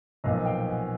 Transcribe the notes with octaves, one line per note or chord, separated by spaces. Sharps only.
B1 A#2 F3 D#5 F5
F5 G5
F#5 G#5